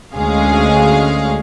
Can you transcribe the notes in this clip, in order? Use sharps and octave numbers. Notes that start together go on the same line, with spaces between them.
D2 G#3 C#4 G#4 F5